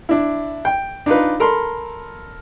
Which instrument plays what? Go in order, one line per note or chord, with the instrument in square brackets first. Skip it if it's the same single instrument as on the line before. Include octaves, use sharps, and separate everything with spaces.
[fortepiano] D4 E4
G5
D4 D#4 F4 B4
A4 A#4 B5 C6